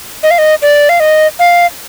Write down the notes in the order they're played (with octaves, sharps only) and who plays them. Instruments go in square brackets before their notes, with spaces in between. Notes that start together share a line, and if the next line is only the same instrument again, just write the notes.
[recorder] D#5
F5
D#5
D5
F5
D#5
F5